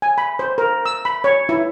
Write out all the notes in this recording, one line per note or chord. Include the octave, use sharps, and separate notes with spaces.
G#5
B5
C5
A#4
E6
B5
C#5
E4